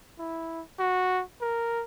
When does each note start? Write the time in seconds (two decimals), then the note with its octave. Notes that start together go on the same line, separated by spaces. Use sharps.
0.18 E4
0.79 F#4
1.41 A#4